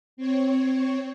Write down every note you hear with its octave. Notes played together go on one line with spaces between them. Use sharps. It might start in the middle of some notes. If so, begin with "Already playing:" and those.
C4 C#5